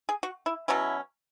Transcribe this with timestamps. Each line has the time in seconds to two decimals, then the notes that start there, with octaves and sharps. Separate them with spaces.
0.09 G#4
0.23 F#4
0.46 E4
0.68 B2 F#3 C#4 E4